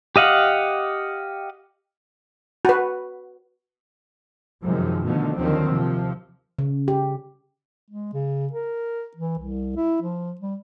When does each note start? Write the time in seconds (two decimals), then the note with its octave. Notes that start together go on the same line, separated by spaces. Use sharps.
0.16 G4 D#5 F5 F#5
2.65 F#4 B4
4.62 F#2 C3 D#3 F3 G#3
5.05 B2 D3 D#3 F3 A3
5.37 D#2 D3 D#3 F3 F#3 C4
5.70 C3 F3
6.59 C#3
6.88 G4
7.90 G#3
8.13 C#3
8.52 A#4
9.16 E3
9.39 C2
9.76 E4
10.02 F3
10.41 G3